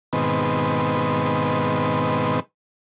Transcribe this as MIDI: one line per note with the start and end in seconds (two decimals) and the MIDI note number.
0.13 2.40 44
0.13 2.40 47
0.13 2.40 51
0.13 2.40 59
0.13 2.40 60